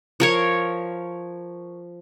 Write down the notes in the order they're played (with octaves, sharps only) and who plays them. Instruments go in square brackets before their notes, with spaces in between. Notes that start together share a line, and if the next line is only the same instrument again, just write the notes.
[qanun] F3 A#4 C#5